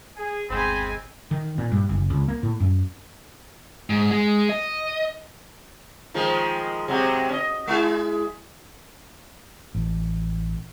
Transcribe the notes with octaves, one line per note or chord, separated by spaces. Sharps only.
G#4
G1 D#2 B2 G#3 C4 C5 G#5 B5
D#3
A#2
G2
F#1
C#2
A#3
A2
F#2
G#2
G#3
D#5
D#3 F3 G#3
C3 F#3 G#3
C#4 D#5
G#3 E4 G#4
A1